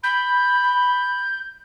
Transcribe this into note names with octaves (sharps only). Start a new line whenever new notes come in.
B5 G6